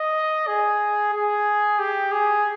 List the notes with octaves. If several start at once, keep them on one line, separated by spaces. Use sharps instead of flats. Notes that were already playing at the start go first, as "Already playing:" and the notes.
Already playing: D#5
G#4
G#4
G4
G#4